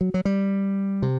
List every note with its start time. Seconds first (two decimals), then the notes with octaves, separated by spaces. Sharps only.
0.01 F#3
0.14 F#3
0.25 G3
1.02 C3